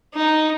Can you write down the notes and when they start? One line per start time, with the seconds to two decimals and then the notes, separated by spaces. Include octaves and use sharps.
0.14 D#4